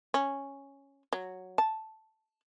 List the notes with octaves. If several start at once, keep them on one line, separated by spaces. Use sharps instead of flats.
C#4
F#3
A5